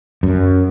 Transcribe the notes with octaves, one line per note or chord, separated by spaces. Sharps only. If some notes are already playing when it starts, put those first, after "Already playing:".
F#2